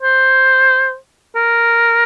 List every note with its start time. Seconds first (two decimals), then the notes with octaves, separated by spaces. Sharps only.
0.02 C5
1.36 A#4